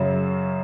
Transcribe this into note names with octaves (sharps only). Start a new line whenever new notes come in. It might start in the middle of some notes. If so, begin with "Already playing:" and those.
Already playing: F#2 C#3 F#3